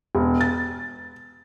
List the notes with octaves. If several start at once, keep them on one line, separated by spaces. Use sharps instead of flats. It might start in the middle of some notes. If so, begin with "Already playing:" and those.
E1
A6